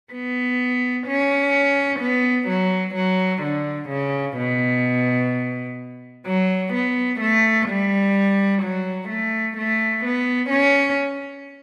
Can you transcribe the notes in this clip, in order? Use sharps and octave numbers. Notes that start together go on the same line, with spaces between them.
B3
C#4
B3
F#3
F#3
D3
C#3
B2
F#3
B3
A3
G3
F#3
A3
A3
B3
C#4